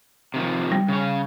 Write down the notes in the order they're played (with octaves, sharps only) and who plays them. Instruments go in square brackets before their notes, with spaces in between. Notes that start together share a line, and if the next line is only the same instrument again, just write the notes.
[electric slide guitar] C3 D#3 F3
[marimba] G3
[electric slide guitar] C#3 C#5